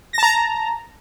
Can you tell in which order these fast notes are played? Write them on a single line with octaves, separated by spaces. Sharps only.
A#6 A5 A#5